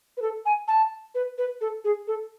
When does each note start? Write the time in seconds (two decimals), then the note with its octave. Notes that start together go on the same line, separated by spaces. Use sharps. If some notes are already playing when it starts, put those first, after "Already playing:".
0.17 B4
0.22 A4
0.45 G#5
0.68 A5
1.15 B4
1.38 B4
1.61 A4
1.84 G#4
2.07 A4